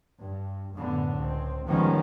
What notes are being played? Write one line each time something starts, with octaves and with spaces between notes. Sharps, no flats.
G2
F#2 A2 D3 B3
C#2 C4
D#3 F3 G3 G#3 B3 C#4